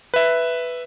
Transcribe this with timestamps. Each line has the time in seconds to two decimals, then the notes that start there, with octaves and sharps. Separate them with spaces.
0.14 B4 E5